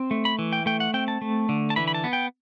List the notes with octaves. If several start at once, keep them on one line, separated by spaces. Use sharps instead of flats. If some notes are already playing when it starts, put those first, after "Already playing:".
Already playing: C4
A3
B5
E3
G5
A3 G5
F#5
C4 G5
A5
A3
D3
A5
E3 B5
B5
A5
B3
G5